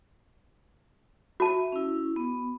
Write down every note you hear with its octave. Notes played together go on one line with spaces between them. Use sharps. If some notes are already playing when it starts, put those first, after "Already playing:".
F#4 E5 A5
C#4 E4
B3